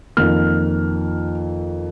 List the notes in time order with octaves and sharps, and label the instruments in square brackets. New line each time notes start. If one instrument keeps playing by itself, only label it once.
[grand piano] F2 D#3 A#3 F6